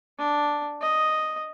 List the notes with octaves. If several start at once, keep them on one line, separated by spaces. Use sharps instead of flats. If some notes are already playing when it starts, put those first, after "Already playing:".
D4
D#5